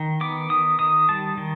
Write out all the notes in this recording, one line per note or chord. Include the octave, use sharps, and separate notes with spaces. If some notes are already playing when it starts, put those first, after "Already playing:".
Already playing: D#3
B3 D6
D#3 D#6
D#3 D#6
G3 A5
D#3